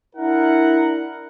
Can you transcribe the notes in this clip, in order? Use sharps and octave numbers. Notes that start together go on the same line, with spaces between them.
D4 E4 A#4 F#5